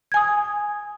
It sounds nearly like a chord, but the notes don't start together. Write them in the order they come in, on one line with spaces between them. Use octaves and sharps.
G#6 G#5 D#6